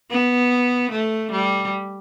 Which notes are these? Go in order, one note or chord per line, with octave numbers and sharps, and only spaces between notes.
B3
A3
G3